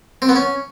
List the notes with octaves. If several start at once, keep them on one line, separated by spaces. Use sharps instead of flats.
C4
B3
C#4